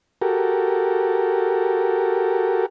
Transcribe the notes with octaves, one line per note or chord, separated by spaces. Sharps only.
F#4 G4 A4 A#4